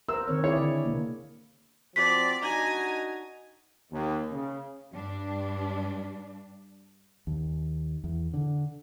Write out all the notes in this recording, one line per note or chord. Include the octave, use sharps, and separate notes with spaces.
A#4 C5 E6
D#3 C4 C#5
E4 G#4 C#5 D5
D3
C3 A#3
F3 C4 F#4 D5 B6
D4 D#4 F#4 G#5 A#5
D#2
C#3
G2 G3 D4
D#2
E2
D3